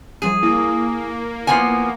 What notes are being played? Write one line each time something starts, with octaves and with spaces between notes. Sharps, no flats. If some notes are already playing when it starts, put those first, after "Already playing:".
F3 G3 G#4 D#7
A#3 E4
F3 B3 G#5